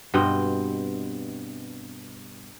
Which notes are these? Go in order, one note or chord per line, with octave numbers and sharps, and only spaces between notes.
G2 B2 C4 D#5